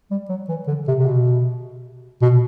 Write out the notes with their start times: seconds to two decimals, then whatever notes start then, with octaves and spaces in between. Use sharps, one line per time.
0.11 G3
0.29 F#3
0.48 E3
0.67 D3
0.88 C3
0.99 C3
1.06 B2
2.22 B2